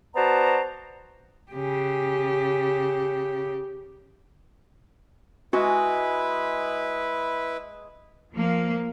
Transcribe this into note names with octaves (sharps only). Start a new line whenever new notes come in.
B3 F#4 C5 D5 A5 A#5
C#3 G4
G#3 E4 F#4 B4 D#5
F3 A#3